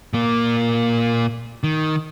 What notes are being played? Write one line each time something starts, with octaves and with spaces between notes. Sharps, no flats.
A#2 A#3
D#3